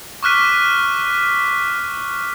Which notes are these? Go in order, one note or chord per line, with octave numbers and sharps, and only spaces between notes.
C#6 D6 F6 F#6 B6 D#7